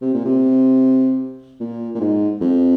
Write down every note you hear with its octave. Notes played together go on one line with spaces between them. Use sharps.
C3
A#2
C3
A#2
A#2
G#2
F2